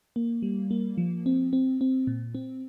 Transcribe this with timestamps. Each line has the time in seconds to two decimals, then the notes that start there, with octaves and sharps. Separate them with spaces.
0.16 A#3
0.43 G3
0.71 A#3
0.98 F3
1.26 C4
1.53 C4
1.81 C4
2.07 A#2
2.35 C4